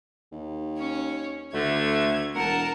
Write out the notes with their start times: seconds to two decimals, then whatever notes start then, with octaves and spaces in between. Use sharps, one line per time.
0.32 D#2
0.78 C#4 C#5
1.53 D2 D3 A3 G#6
2.35 E1 A#4 F#5 A5